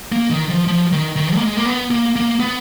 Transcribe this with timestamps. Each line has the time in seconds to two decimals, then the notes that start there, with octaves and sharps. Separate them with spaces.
0.12 A#3
0.30 D#3
0.49 F3
0.67 F3
0.92 D#3
1.16 D#3
1.35 A#3
1.41 G#3
1.57 A#3
1.66 B3
1.91 A#3
2.16 A#3
2.40 B3